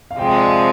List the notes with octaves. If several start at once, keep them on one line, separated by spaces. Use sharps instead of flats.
F5
C3 F3 G#3 G5
D#5
D5
F5